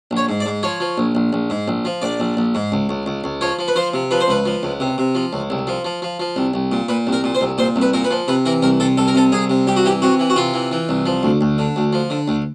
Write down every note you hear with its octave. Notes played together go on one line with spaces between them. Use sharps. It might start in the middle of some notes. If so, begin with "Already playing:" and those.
A#1
C#5
G#2
D5
G#2
F3 C#5
F3
A#1
A#1
A#1
G#2
A#1
F3
A#1 D5
A#1
A#1
G#2
C#2
C#2
C#2
C#2
F3 C#5
F3
B4
F3 C5
C3
F3 B4
C5
C#2 B4
F3
C#2
C3
C3
F3
C#2
C2
F3
F3
F3
F3
C2
C2
A#2
A#2 B4
C2
A#4
A#2
C5
C2
A#2 C5
C2
B4
A#2 A#4
B4
F3
C3 B4
E3 A#4
C2 A#4
C3 A4
C2 A4
A#4
C3 A4
C2 G#4
C3
C2 G4
F#4
E3 G4
C3 F#4
E3
F#4
C3 F4
E3
E3
C2
F3
D2
D2
D3
D2
F3
D3
D2